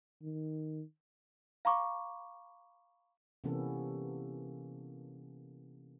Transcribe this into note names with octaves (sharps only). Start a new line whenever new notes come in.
D#3
F5 A#5 B5 C#6 D6
C3 E3 A#3 B3 C#4 A4